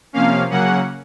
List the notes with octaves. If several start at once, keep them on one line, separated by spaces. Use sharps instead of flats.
C3 F3 A#3 C#4 F5
C#3 F#3 A#3 C#4 F#5